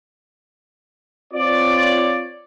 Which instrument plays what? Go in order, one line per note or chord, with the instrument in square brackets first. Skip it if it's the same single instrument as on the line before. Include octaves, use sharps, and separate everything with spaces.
[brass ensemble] C4 F4 C#5 D5